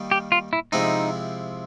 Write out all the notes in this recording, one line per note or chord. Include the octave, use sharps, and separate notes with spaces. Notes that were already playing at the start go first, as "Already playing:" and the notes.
Already playing: D#3 G3 A#3 D#4
G4
F4
E4
C3 F3 G#3 C4 D#4 E4